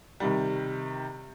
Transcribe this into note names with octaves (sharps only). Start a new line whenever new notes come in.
C3 D#3 G3